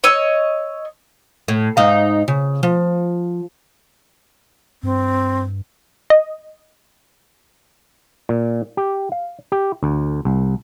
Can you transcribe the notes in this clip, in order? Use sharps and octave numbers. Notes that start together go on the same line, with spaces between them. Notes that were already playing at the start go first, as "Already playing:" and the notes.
C#5 D#5 E6
A2
G#2 D#4 F5
C#3
F3
G2 C4
D#5
A#2
G4
F5
G4
D2
C2